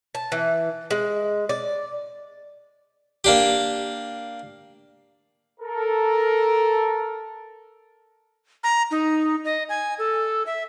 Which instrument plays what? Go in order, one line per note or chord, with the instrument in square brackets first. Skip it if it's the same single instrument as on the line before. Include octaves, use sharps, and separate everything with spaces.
[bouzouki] A5
E3
G#3
D5
[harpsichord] A#3 D4 G4
[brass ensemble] A4 A#4
[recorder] A#5
D#4
D#5
G#5
A4
E5